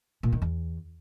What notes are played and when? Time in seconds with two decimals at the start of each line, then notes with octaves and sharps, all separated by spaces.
0.23 A#2
0.32 D#3
0.42 E2